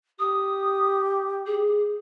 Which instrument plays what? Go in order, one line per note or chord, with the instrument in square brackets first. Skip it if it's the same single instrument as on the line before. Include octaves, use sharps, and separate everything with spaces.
[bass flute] G4 [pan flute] D#6
[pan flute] G#4